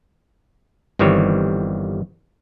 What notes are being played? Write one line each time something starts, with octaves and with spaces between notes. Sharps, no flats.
G1 D#3 E3 G3 C4 C#5